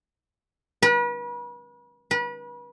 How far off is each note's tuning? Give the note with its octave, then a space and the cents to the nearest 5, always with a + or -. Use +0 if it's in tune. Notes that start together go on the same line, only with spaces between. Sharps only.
B4 -40
B4 -35